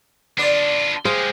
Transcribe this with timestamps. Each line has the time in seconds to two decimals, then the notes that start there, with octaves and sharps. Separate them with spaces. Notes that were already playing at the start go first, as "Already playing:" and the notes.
0.38 D3 B3 D4 F4 D5
1.05 G#3 G4 G#4 C5 F5